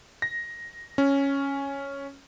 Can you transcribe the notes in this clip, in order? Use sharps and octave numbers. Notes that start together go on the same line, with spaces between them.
A#6
C#4